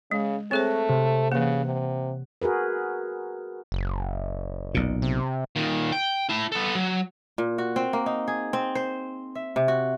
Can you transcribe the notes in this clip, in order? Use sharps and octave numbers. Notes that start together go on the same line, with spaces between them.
C#3 G#3
A3 C4 G#4 C5 C#5 F#6 A#6
C3
C#3 E3 A#3 F#5
C3
F#4 G#4 A#4 B4
F#1
B1 A#2
C3
A#2 D#3
G5
E4 A5
B3 A4
F#3
A#2
F#4
C4
A#3
D#4
G#4
C4
C5
E5
C3
F#4